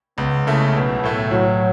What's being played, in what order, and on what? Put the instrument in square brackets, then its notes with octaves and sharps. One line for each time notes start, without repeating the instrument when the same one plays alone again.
[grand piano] C#2 [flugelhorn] B3
[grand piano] C#3 A3 E4
[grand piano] B1 [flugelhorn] B3
[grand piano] A2 A3
[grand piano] A2 [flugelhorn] F#3